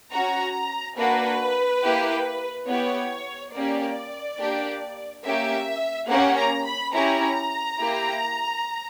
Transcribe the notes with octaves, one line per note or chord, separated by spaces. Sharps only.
C#4 F#4 A#5
A#3 D4 F#4 B4
A#3 E4 G4
B3 E4 G4 C#5
A#3 C#4 G4 D5
A#3 D4 G4
A#3 C#4 G4 E5
A#3 C#4 G4 F#5
A#5
B5
C#4 E4 G4 A#5
A#3 E4 G4